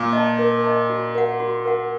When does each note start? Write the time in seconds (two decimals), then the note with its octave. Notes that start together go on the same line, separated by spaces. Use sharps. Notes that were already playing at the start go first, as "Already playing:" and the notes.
Already playing: A#2
0.13 D#5 A5
0.39 A#4
0.64 D#5 A5
0.90 F#4
1.15 A#4 F#5
1.40 F#4
1.65 A#4 F#5